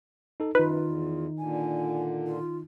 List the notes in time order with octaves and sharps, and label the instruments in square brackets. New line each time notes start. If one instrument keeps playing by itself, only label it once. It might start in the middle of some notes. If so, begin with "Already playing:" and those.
[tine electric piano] D#4 A4
[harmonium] F#2 [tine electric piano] D#3 D#4 [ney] F4 [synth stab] B4
[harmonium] E2
[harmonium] A#2 D3 [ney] G#5
[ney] F4